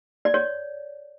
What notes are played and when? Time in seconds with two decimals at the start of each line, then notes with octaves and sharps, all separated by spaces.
0.25 D5
0.34 C#5